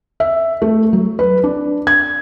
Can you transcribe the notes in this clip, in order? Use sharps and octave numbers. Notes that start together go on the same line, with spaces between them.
E5
A3
F#3
B4
D4
G#6